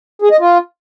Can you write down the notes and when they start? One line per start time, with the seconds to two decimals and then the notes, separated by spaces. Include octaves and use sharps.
0.22 G#4
0.31 D#5
0.40 F4